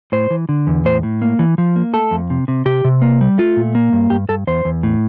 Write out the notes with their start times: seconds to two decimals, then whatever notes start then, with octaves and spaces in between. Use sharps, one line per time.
0.12 A2 C5
0.30 E3
0.49 D3
0.67 E2
0.85 A2 C5
1.03 A2
1.22 A#3
1.39 E3
1.58 F3
1.76 A#3
1.93 A3 A4
2.11 F2
2.30 C3
2.48 C3
2.65 C3 G4
2.84 C3
3.02 A#3
3.21 G3
3.38 A3 F4
3.57 A#2
3.75 A#3
3.93 G2
4.10 G2 G4
4.29 G2 A4
4.47 E2 C5
4.65 E2
4.83 A2